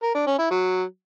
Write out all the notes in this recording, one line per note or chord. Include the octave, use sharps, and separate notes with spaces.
A#4
D4
C#4
E4
F#3